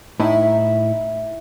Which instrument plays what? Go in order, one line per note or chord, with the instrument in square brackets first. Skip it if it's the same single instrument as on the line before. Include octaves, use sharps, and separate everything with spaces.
[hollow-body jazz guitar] A2 D#4 [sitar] E4